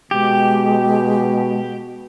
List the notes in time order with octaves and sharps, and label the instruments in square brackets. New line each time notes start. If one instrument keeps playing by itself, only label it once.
[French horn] B2 [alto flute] G#3 [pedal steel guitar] G4